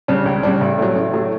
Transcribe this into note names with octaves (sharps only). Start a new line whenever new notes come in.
C#3 G3 D4
C#2
C#3 G3 D4
A1
A2 F#3
A1
A2 F#3